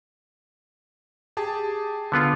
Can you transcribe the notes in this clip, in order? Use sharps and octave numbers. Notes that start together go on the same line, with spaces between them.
G4 G#4 A5
D3 B3 F4